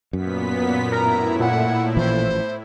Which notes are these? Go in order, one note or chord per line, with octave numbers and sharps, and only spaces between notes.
F#2 A#2 B3 B6
A2 E4 A#4 A#5
A#2 F#5
A1 E3 F3 C5